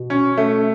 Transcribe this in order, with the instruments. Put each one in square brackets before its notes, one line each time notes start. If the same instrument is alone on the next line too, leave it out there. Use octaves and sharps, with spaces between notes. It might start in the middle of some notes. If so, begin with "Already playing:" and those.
Already playing: [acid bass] B2
[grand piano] C#4
A3